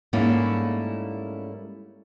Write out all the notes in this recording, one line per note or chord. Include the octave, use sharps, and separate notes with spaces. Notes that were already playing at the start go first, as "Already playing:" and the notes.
G#2 G3 A3 A#3 C#4 E4